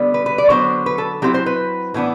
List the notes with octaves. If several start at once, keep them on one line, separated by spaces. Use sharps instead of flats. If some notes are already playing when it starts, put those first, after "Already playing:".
Already playing: D3 G3 B3
B4
B4
D5
D3 F#3 B3 C5
B4
A4
F#3 C4 E4 G4
C5
B4
A2 E3 B3 D4